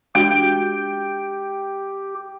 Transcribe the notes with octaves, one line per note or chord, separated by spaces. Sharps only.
G#3 D4 F#4 G4 G5